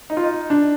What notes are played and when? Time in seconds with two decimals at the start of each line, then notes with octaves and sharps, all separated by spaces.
0.10 D#4
0.17 F4
0.24 D#4
0.50 D4